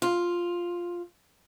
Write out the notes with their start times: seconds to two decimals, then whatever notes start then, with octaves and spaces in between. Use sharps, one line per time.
0.02 F4